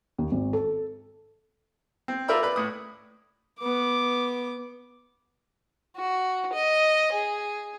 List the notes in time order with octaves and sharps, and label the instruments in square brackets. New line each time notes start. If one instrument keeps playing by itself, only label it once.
[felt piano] D#2
G#1
A4
[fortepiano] C4
F4 A#4 D5 E5 B5 E6
B4 D5 B5
A2 D#6
[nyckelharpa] B3 D6
[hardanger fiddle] F#4
D#5
G#4